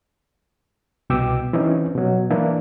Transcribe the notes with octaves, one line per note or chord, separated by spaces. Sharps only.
C2 B2 G5 D6 E6
E3 C4 C#4 D#4
B2 F#3
E3 A#3 D4 E4